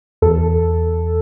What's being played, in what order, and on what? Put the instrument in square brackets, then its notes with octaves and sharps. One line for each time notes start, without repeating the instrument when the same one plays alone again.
[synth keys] E2 A4